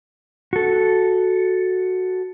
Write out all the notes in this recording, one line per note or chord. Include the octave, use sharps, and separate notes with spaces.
F#4 A4